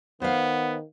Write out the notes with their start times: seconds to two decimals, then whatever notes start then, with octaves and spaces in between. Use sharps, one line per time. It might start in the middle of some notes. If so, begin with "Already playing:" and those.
0.22 D#3 B3 C5 F5 F#5